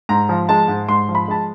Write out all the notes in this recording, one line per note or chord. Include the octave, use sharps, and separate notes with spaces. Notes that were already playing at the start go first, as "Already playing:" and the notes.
G#2 A#5
F3
G#3 A5
G#2
G#2 C6
F3
B5
G#3 A5